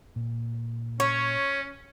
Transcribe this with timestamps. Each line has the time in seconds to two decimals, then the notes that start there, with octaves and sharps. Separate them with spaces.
0.16 A#2
1.00 C#4 C#5